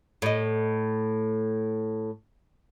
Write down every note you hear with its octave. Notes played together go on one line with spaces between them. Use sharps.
A2 D#5